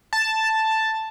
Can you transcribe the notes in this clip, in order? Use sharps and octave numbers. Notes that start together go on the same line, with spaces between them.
A5